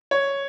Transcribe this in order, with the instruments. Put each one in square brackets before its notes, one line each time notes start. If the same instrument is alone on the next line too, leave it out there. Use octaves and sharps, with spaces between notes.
[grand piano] C#5